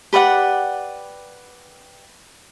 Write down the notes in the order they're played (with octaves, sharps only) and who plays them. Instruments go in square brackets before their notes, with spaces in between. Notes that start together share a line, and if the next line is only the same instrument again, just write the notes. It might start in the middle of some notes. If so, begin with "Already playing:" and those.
[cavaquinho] G4 B4 D5 F#5